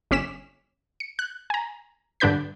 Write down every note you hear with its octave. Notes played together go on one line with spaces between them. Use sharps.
G1 C#4 D6 B6 E7
C#7
F#6
G#5 A#5
G2 D3 D4 B4 G6 B6